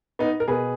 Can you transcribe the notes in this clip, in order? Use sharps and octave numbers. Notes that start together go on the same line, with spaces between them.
B3 D#4
A#4
B2 G#4 B4